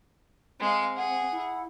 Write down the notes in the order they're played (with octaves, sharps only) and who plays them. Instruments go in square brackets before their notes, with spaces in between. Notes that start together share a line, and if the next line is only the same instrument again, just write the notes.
[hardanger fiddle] G#3 F5 [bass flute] C4
[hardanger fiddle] G#4 [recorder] F#5
[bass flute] E4